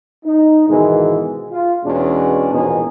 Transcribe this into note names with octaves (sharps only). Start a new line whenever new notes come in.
D#4
G#2 B2 D#3 E3 G#3
F4
E2 B2 G#3 B3 C#4 D4
A#1 E2 G#2 B2 D#4 G#4